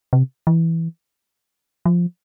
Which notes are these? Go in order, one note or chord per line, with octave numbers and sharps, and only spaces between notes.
C3
E3
F3